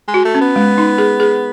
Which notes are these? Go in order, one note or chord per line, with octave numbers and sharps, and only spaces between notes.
G#3
F#4
A3
C#4
B3
G#3
D#4
G#4
G#4